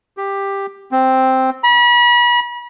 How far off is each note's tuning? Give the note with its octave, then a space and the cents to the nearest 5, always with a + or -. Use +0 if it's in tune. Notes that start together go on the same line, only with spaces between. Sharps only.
G4 +10
C4 +0
B5 -35